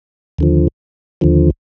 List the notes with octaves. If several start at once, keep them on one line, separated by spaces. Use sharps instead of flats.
D#2 D3 F3
D#2 D3 F3